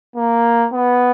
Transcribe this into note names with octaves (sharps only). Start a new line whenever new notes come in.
A#3
B3